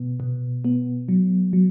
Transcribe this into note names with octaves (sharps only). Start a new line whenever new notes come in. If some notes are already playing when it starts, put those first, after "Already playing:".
Already playing: B2 B3
B2
B3
F#3
F#3